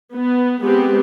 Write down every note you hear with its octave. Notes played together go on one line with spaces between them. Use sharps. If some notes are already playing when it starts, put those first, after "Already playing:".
B3
G#3 B3 C4 G4